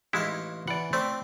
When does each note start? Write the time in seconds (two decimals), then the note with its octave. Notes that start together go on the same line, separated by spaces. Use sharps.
0.13 A1 G#3 D#4 E4 F5
0.68 E3 D5 F#5
0.93 A3 C4 C5 D5